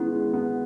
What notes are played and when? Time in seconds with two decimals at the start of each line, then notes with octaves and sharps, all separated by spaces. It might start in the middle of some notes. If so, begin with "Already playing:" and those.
Already playing: G#3 B3 C#4 E4
0.13 G#3
0.33 B3